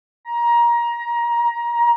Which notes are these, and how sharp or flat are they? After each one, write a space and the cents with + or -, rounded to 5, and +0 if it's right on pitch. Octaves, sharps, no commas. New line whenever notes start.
A#5 +20